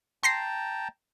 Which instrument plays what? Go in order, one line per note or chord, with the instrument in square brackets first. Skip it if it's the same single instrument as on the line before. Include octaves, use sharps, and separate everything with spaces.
[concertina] G5 A5 A#5 [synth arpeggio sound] C6 A#6 C7